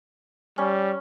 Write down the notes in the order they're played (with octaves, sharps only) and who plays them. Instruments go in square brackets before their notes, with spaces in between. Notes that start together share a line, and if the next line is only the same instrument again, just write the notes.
[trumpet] G3 [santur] C#4